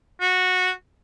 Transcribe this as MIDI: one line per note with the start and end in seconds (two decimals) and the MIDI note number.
0.21 0.70 66